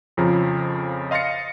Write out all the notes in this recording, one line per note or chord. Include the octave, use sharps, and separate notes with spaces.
F2 C#3 F3 A#5
D#5 F5 C6 A6 A#6 C#7